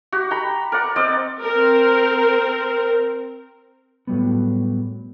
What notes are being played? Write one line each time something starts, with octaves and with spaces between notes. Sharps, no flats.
F#4 G4
G5 A#5 B5
A#4 D5 F#5
C4 D5 D#5
C4 A#4
A2 F#3 G3 B3